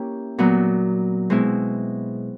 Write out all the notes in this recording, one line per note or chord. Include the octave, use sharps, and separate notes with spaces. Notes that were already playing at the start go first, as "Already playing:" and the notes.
Already playing: A#3 C#4 E4 G4
A#2 F#3 B3
B2 G#3 C4 E4